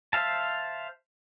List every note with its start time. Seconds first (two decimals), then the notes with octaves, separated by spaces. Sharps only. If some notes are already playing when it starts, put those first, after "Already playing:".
0.13 C5 E5 F5 A5